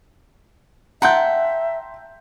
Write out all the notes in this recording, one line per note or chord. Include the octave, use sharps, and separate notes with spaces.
E5 F#5 G5 A5 A#5 C6 G6